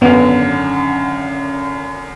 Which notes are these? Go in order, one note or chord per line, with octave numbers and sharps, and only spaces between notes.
G#1 F#2 D3 B3